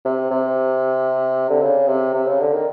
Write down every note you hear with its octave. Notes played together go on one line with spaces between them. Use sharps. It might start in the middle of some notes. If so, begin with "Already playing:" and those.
C3
C3
D3
C#3
C3
C3
C#3
D3
D#3